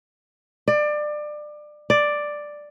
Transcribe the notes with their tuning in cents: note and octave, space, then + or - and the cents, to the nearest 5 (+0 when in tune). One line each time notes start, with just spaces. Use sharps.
D5 +25
D5 +5